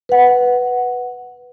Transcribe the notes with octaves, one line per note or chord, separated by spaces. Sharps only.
B4 F#5